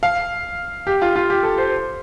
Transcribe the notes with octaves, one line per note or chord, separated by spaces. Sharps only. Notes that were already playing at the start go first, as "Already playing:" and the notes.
F5
G4
F4
F4
G4
A4
C5